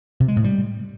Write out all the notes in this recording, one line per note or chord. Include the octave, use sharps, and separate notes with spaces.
C3
G#3
A2
G3